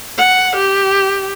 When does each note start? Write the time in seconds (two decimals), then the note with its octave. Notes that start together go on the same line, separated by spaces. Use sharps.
0.17 F#5
0.56 G4